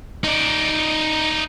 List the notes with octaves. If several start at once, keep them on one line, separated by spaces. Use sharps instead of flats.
D#4 D5